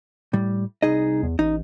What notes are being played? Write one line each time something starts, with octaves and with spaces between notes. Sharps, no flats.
A2 G3
C2 D#4 G#4 D#5
E2
A1 D#4